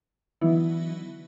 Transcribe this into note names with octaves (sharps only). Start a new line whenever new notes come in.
D3 E3 F#3 B3 D#4 E4